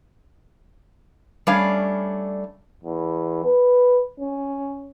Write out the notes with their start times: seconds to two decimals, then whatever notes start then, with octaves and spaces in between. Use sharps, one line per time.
1.47 G3 A3 C#4 D4 C#5 F5
2.84 E2
3.44 B4
4.20 C#4